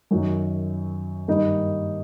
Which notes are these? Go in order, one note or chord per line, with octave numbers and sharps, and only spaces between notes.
F#2 D#3 F#3
G2 D#3 G3 A#3 D#4